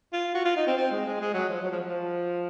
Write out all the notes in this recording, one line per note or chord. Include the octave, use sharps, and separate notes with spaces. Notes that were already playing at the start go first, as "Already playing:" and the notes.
F4
F#4
F4
D#4
C4
C4
G#3
G#3
G#3
F#3
F3
F#3
F3
F3